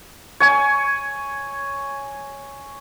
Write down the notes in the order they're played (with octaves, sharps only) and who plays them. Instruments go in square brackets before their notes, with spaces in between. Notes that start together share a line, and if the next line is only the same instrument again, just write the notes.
[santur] C#5 G#5